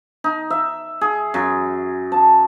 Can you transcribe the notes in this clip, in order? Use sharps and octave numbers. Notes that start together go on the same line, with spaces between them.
D#4
E5
G#4
F#2
A5